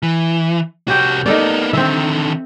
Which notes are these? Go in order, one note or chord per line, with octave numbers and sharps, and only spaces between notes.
E3
C2 C#4 F#4 G4 G5
A#3 B3 D#4 A4 D5
D3 D#3 C4 E5